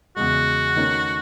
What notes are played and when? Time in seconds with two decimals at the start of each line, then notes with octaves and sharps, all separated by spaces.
0.16 E2 C#3 G#3 F#4
0.76 D#3 A3 C#4